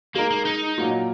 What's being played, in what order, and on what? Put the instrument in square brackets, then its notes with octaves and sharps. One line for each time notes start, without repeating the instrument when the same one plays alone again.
[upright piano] G#3 D#4 A#4 [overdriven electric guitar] A#3
[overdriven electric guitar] A#3
D#4
[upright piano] A#2 F#3 A#3 F4